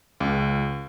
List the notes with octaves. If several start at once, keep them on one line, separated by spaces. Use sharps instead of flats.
C#2